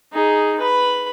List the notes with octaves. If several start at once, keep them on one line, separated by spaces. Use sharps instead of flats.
D#4 G#4
B4 B5